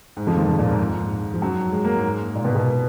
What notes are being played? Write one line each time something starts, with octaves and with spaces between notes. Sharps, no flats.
G#2 G#3
F2 F3
D#2 D#3
D#2 D#3
A#2 A#3
G#2 G#3
F3
F#2 F#3
G#3
A#3
G#2 G#3
A#2 A#3
B2 B3
B2 B3